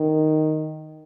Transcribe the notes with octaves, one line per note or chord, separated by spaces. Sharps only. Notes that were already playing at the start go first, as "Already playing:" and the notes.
Already playing: D#3